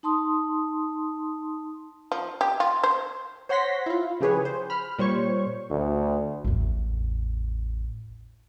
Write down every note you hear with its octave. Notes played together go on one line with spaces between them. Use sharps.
D#4 A5 C6 D#6
F3
G4
F4
C5
C5 C#5 F#5 C6 A#6 B6
E4 F4
C#3 F3 G4 G#4 B4 C#5
C5
B5 F6
A#2 G3 C5 C#5 C#6
D2
A1 E2